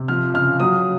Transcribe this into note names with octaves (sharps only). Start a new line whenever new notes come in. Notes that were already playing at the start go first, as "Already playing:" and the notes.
Already playing: C3
F3 F6
C#3 F6
F#3 D#6